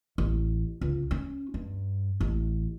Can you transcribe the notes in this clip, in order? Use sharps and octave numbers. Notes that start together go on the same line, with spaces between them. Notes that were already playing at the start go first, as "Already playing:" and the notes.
A1
C#2
C#4
G2
A1